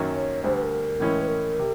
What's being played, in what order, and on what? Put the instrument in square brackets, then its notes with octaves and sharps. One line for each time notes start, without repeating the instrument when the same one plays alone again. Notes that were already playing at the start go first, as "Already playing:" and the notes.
Already playing: [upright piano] F#2 D#3 F#3 A#3 C#4
[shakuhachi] C#5
[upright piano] D2 D3 G3 [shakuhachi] C5
[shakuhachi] B4
A#4
[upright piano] A2 E3 G#3 C#4 E4
[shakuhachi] B4
A#4
[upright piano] C3